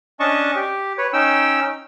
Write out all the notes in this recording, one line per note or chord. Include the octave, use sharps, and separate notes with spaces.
C#4 D4 D#5 A5 C#6
G4
B4 C#5
C#4 D#4 G5 E6